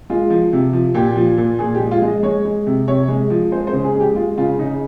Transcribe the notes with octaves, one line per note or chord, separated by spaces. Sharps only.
G#3 F4
F3
C3
F3
A#2 G4
F3
A#2
A#2 G#4
G4
G#3
F4
G#3
D#5
G#3 C#5
G#3
C3
C3 C#5
G#3
F3
G#3 C5
C5
C#3
G#4
G#3
G4
G#3 F4
C#3 F4
C#3 D#4